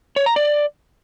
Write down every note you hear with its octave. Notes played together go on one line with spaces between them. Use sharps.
C#5
A#5
D5